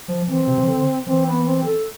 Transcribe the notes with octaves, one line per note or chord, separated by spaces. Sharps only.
F3
E3 C4
C3
E3
D3
E3 C4
B3
C4
A4